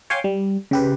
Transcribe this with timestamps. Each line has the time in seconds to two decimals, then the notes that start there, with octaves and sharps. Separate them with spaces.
0.10 C#5 F5 G5 G#5 C6 D6
0.24 G3
0.71 C#3 G4 B4